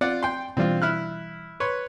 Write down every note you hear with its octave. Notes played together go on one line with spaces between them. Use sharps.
C4 F4 D5 F#5
G5 C6
B2 E3 G3 C4 D4 F4
E4 F6 F#6
B4 C#5 C6